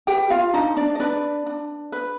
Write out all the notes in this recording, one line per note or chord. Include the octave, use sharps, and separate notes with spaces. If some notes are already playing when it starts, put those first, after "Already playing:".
G4 B4 G5
F4 F5
D4 D#4 D#5
D4 D5
D#5
D4 B4 D5
D4
B4